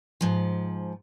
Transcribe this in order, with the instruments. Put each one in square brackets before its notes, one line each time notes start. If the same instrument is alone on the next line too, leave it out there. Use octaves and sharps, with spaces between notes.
[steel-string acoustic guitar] G#2 F3